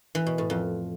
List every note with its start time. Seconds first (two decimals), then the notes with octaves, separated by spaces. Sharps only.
0.15 E3
0.27 B2
0.38 A2
0.50 F2